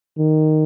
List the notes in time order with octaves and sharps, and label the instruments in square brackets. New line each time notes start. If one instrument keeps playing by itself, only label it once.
[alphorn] D#3